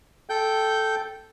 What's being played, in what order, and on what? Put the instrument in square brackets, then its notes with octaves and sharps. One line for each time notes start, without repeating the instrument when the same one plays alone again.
[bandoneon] A4 G5 G6